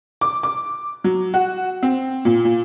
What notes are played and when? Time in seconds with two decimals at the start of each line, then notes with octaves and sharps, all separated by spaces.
0.21 D6
0.43 D6
1.04 F#3
1.34 F#4
1.83 C4
2.25 A#2
2.45 A#2